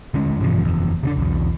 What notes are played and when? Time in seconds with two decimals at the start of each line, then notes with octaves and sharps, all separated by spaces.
0.14 D3 G#3 C#4
0.40 G2 B2 E3 F3
0.62 F#1 E2
1.03 C#3 C4 D4
1.16 B1 E2